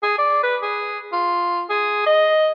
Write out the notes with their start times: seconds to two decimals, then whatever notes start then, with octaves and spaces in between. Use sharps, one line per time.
0.03 G#4
0.18 D5
0.43 B4
0.62 G#4
1.12 F4
1.70 G#4
2.06 D#5